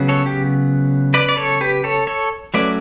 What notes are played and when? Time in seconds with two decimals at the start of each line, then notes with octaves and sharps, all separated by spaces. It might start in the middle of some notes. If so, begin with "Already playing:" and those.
Already playing: C#3 F#3 B3
0.08 A4 C#5
0.26 G4
1.14 B4 D5
1.29 D5
1.37 A4 C#5
1.61 G4 B4
1.84 A4 C#5
2.07 A4 C#5
2.54 F#3 A3 C#4 B4 D5